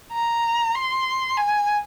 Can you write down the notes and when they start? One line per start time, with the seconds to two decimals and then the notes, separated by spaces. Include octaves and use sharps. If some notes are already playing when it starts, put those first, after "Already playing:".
0.13 A#5
0.75 C6
1.37 G#5